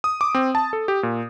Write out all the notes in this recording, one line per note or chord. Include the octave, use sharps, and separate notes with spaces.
D#6
D6
C4
A5
A4
G4
A#2